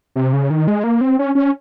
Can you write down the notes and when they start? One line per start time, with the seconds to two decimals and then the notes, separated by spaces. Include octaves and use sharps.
0.16 C3
0.33 C#3
0.50 D#3
0.68 G#3
0.84 A#3
1.01 C4
1.19 C#4
1.35 C#4